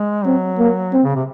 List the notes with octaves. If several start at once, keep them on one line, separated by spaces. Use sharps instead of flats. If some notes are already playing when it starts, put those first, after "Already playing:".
Already playing: G#3
F#3 C4
A#3
C4
C#3
C3